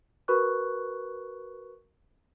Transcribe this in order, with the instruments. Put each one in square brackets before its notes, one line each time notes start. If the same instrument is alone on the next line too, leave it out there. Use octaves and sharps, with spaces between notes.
[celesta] F#4 A#4 B4 B5 C#6 F#6